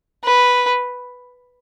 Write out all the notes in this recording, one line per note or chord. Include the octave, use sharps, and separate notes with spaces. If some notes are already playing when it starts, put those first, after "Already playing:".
B4